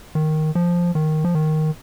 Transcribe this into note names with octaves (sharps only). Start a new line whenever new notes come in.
D#3
F3
D#3
F3
D#3